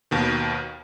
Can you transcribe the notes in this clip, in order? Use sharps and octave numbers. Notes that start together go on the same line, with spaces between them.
D#2 B2 D#3